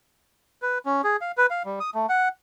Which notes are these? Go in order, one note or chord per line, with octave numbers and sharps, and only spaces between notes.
B4
C#4
G#4
F5
B4
F5
G3
D#6
A3
F#5